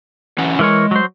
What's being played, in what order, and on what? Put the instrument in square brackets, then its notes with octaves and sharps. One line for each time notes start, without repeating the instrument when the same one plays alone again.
[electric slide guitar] E3 C#4 F#5
[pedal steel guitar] E3 A#4 C#5 [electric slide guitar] G#3
[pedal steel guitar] F#3 C5